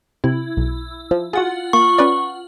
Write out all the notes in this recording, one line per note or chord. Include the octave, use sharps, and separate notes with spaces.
C3 E4
B1
F3
F4 F#4 G#4 F#5
A#3 C#6
C#4 B4 D5